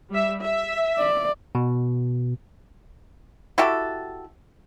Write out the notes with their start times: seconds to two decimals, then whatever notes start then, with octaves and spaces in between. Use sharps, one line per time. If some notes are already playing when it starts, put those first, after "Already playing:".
0.11 G3 E5
0.43 E5
0.98 D5
1.55 B2
3.58 E4 F#4 G4 A4